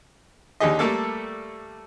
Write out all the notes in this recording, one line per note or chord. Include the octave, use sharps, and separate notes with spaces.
D#2 D3 D#4 G4 G#4 D#5
G3 A3 A#3 A4